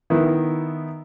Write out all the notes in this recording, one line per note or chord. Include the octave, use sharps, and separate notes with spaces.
D#3 B3 D#4 E4